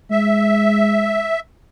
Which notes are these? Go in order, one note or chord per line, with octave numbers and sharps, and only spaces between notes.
G#3 E5